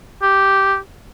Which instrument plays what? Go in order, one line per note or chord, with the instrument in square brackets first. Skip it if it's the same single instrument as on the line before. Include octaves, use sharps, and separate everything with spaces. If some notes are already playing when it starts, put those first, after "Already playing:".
[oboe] G4